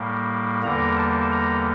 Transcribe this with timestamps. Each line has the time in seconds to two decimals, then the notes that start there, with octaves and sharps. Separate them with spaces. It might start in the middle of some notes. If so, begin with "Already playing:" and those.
Already playing: A2 G3 A#3
0.63 E2 D3 G3 A#3 A#5
0.98 A5
1.32 A#5